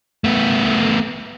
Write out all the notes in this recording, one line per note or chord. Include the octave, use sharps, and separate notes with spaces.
A3 B3